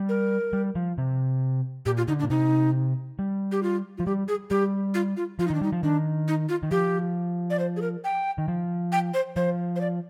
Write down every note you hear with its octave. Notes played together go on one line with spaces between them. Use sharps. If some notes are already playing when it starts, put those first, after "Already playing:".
Already playing: G3
A#4
G3
F3
C3
A#2 G4
F4
D3 D#4
D4
A#2
C3 D#4
G3
G4
F4
F3 F4
G3 G4
G#4
G3 G4
F4
F4
F3 F4
D#3 D#4
D4
G3 D#4
F3
D#3 D4
D#4
F4
D#3
F3 G4
D5
C5
G#4
A#4
G5
D#3
F3
G5
C5
F3 C5
C5
D5